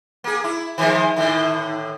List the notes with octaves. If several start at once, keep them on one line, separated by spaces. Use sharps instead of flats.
A#3 G#4
E4
D#3 F3 G#3
A2 D3 D#3